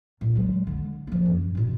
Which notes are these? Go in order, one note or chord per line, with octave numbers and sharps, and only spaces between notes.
A#2
F#3 G#3
D3
F3 A#3
F#2
G2 B2